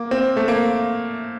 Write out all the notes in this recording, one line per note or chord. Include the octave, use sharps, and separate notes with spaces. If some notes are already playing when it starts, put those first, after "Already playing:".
Already playing: A#3
C4
A3
A#3